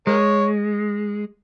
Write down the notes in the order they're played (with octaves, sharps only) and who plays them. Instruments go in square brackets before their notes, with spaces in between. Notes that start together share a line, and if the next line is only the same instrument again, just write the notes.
[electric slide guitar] G#3 [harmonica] A#4 C#5